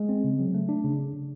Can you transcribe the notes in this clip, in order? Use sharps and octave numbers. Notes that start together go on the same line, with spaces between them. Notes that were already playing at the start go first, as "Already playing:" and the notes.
Already playing: G#3
C4
C#3
F#3
A3
D4
C#3